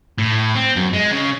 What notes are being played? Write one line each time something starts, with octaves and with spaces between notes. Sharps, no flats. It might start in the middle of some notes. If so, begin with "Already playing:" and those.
A2
C4
F#2
G#3
C#3